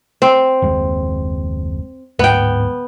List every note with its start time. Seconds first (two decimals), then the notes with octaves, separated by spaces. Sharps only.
0.22 C4
0.62 F#1 D#2 G#3
2.19 D1 G#2 B3 G5